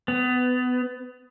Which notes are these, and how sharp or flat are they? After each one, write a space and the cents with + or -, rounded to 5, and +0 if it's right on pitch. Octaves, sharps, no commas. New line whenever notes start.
B3 +25